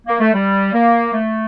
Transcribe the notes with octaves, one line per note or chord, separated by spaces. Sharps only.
A#3
A3
G3
A#3
A3